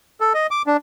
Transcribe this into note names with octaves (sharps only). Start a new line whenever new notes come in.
A4
D#5
D6
D4